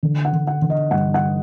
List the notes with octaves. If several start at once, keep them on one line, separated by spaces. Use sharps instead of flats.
D3
F#5
D3
F#5
D3
D#5
G2 F#5
F#5